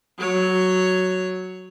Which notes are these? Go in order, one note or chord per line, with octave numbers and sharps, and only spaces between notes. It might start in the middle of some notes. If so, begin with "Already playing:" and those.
F#3 C#5